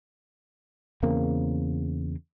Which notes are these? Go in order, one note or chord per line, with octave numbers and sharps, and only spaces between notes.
E2 C#3 A#3 C4